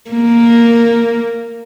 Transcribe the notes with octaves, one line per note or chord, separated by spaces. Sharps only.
A#3